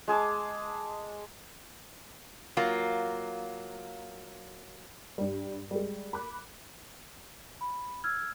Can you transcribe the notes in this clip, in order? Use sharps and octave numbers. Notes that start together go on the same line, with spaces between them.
G#3 G#4 A5 D6
F#3 A#3 F4
G2 G3
G3 G#3
B5 D6 F#6
B5
E6 F6 G#6